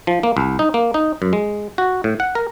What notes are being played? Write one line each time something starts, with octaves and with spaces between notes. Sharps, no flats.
F3
A#3
C2
D#4
A#3
D#4
F#2
G#3
F#4
A2
F#5
A#4